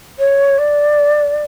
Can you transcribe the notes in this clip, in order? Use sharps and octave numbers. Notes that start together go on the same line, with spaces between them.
C#5
D5